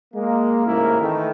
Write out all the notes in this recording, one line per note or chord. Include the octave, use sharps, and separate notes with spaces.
G#3 A#3
A1 G#2 C#3 A#3 E4 A#4
D#3 E3 A3